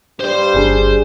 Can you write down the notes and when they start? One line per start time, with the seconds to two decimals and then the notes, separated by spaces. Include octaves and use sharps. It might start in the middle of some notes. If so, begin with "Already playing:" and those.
0.21 G2 G3 C5 C6
0.55 G1 C#4 D4 G#4